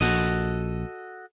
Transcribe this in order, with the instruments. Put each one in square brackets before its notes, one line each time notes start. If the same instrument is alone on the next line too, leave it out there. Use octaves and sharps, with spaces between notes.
[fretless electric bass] A#1 [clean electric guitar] F#4 A4 D#5